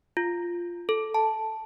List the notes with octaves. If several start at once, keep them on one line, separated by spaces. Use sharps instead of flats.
F4
A4
A5